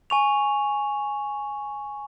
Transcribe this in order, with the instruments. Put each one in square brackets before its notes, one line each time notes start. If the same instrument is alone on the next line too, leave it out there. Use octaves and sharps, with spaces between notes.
[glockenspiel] G#5 C#6 F7